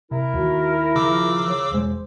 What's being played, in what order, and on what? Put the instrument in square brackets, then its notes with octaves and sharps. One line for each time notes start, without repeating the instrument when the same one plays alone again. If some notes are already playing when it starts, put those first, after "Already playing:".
[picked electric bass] C3 [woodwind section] E4 A#4
[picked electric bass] D#2 D#3 [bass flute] F#4
[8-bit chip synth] C#3 D6 E6 [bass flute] F3
[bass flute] C#5
[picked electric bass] E1 G#3 [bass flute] C5